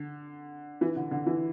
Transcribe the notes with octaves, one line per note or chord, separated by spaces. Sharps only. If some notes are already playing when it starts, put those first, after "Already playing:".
Already playing: D3
E3
D3
D3
E3